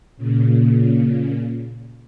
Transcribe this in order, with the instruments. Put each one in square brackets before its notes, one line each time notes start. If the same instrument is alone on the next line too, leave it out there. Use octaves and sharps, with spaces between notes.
[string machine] A#2 C#3